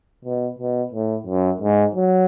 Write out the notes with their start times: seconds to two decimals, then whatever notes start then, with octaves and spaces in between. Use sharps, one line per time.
0.25 B2
0.59 B2
0.93 A2
1.27 F#2
1.61 G#2
1.95 F#3